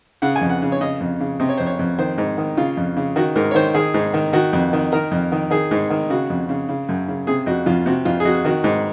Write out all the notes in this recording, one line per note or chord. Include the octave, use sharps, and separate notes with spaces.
C#3 F#5
G#5
F2
F#5
C#3
C#5
C#3 D#5
F2
C#3
C3 D#5
C#5
F2 C5
C#5
F2
D#3 C5
G#2
D#3
C#3 F4
F2
C#3
D#3 F#4
G#2 A#4
C#5
D#3 C5
D#3 G#4
G#2
D#3
D#3 F#4
F2
D#3
D#3 A#4
F2
D#3
D#3 G#4
G#2
D#3
C#3 F#4
F2
C#3
C#3
F#2
C#3
C3 G#4
F2 F#4
F2 F4
C3 F#4
F2 F4
G#4
F2 F#4
D#3 F#4
G#2